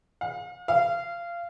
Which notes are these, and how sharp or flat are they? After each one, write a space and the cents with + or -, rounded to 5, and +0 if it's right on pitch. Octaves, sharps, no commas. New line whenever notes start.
F5 +40
F5 -20